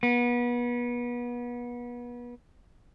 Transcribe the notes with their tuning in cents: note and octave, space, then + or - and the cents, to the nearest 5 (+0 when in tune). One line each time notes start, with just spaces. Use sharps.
B3 -30